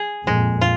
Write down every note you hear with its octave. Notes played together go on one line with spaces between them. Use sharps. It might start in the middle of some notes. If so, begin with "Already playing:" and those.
Already playing: G#4
F2 A#2 G#3
F4